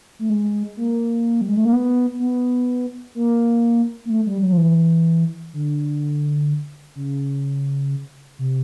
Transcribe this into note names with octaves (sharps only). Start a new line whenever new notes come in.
A3
G#3
A#3
G3
G#3
A3
A#3
B3
B3
A#3
A#3
A3
G3
F#3
F3
E3
D3
C#3
C3